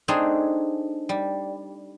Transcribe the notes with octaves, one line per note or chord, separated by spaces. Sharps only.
A3 C4 D4 D#4 G#4
G3